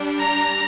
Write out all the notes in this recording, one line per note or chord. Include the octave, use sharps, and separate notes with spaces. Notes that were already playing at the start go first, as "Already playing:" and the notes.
Already playing: G3 D4
A#5